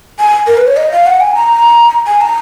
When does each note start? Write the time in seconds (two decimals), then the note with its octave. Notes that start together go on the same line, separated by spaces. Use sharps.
0.20 G#5
0.47 A#4
0.57 B4
0.67 C#5
0.77 D#5
0.92 F5
1.06 F#5
1.20 G#5
1.35 A#5
2.07 G#5
2.21 A#5